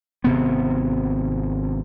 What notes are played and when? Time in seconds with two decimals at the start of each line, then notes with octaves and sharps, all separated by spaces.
0.24 G#1 C3 B3